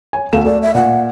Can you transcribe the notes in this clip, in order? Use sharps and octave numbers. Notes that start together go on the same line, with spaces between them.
C#5 G#5
D2 A3 F5 E7
A3 D5
E5
A#2 F#5